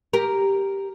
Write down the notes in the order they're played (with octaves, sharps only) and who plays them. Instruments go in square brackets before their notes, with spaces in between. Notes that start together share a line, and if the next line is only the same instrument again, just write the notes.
[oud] G4 A#4